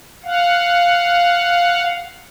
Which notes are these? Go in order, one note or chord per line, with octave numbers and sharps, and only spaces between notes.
F5 F#5